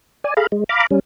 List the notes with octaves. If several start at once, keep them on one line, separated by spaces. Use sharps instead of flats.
D5 G#5
G#4 A4 F5 A#5 B5
G#3
F5 A#5 B5 D6
G3 C#4